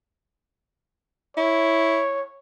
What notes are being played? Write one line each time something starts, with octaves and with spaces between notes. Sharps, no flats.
E4 C#5